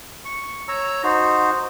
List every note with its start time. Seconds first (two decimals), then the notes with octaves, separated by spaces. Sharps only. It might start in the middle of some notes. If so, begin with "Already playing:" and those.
0.25 C#6
0.68 C#5 A#5 E6
1.03 D#4 F#4 C5